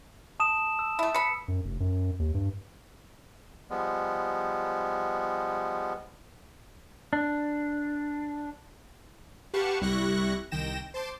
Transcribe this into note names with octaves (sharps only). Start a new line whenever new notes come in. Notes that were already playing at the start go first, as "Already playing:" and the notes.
A5 D#6 E7
E6
A3 E4
B4 B5 C#7
F#2
F1
F#2
D#2
G2
F3 G3 G#3 B3
D4
G4 B4 F5 F#5 A5 C#6
C2 G3 E4 C#6 F#6 A#6
C2 D#3 G5 A#6 E7
C5 A5 C6 D6